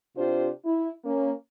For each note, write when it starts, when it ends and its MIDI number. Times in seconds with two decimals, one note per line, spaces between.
0.16 0.48 48
0.16 0.48 62
0.16 0.48 65
0.16 0.48 67
0.16 0.48 72
0.65 0.89 64
1.04 1.31 58
1.04 1.31 61